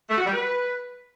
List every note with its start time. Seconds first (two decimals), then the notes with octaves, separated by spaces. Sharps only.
0.10 A3
0.18 F#4
0.26 G3
0.33 B4